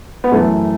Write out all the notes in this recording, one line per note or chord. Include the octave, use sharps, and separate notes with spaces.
B3
F#2 E3 A3